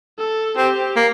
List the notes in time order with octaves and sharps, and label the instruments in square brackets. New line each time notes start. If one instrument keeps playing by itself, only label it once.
[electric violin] A4
[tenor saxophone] C4 [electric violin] G4
[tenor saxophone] A#3